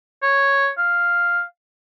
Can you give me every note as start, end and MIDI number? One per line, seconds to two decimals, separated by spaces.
0.23 0.69 73
0.78 1.42 77